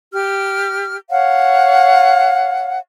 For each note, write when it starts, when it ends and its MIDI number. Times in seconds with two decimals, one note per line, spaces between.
0.13 0.97 67
0.13 0.97 89
1.10 2.78 73
1.10 2.78 77
1.10 2.78 78